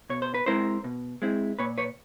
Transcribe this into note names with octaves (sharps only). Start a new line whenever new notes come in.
B2 C#5
C5
B4
G#3 C4 E4 A#4 C5
B2
G#3 C4 E4
A#2 B4 C#5
B4 C#5